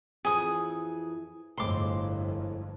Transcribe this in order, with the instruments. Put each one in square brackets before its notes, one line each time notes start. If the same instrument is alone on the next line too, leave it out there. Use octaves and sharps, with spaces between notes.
[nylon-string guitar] F2 E3 [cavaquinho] G#4 D#6
[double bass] G1 F2 [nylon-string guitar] A2 G#3 C4 [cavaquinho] C6 D6